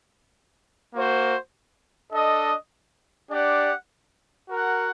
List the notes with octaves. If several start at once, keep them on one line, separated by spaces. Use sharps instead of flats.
A#3 F#4 C5
D4 A4 D#5
D4 G4 D5 F#5
F#4 A#4 F#5